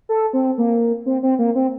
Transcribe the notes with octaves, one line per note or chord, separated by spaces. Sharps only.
A4
C4
A#3
C4
C4
A#3
C4